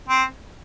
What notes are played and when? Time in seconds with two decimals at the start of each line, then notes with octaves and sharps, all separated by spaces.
0.09 C4